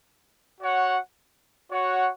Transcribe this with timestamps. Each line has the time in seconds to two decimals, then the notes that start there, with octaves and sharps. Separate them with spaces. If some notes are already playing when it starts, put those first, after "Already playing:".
0.61 F#4 C#5 F#5
1.72 F#4 C#5 F#5